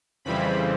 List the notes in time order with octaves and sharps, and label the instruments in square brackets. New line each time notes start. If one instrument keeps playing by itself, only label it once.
[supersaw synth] F2 C#3 E3 G3 C4 B5